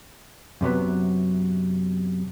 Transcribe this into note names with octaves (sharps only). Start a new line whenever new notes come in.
F#2 C3 F#3 B3